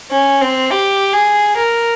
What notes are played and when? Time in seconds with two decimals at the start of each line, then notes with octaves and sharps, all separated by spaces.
0.11 C#4
0.41 C4
0.71 G4
1.14 G#4
1.57 A#4